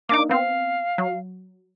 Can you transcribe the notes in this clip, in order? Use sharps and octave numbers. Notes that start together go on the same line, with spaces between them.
A#3 D4 D#4 D6
B3 C4 F5
F#3